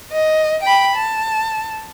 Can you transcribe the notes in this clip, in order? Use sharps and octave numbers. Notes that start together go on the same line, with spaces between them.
D#5
G5 B5
A5